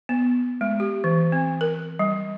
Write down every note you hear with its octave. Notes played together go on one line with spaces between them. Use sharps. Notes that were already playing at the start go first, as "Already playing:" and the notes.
B3
G#3
G4
E3
C4
A#4
G3